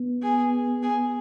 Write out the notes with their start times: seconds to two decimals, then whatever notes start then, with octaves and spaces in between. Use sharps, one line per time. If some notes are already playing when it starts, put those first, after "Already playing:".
Already playing: B3
0.23 G#4
0.83 G#4